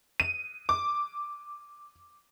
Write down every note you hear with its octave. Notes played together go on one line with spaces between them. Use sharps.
D#7
D6